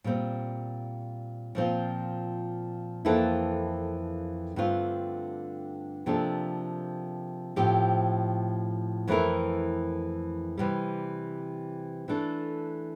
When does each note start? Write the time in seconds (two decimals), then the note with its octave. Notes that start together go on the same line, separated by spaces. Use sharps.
0.04 A#2 G3 C4
1.55 A#2 F3 C4 F4
3.05 F2 E3 A#3 E4 A4
4.56 G2 D3 A3 C4 F4
6.06 C3 F3 A#3 D4 A4
7.56 A2 F3 C4 G4
9.08 F2 E3 A3 E4 A#4
10.58 C3 E3 G3
12.08 E3 A3 D4 A4